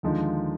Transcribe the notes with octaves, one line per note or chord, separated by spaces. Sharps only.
D#2 D3 F3 G#3 D#4